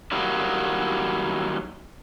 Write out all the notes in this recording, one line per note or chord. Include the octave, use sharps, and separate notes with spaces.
D#3 F#3 G3 A#3 E4